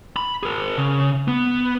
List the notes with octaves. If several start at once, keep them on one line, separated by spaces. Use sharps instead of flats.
B5
G#4 A#4
C#3
B3